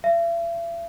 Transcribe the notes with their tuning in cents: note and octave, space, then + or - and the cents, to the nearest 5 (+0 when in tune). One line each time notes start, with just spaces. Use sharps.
E5 +45